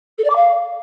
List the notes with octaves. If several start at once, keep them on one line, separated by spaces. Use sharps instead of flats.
A4
D5
D6
F5